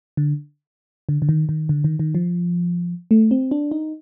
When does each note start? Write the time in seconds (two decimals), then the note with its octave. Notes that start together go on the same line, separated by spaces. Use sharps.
0.17 D3
1.09 D3
1.22 D3
1.29 D#3
1.49 D#3
1.69 D3
1.84 D#3
1.99 D#3
2.15 F3
3.11 A3
3.31 C4
3.51 D4
3.71 D#4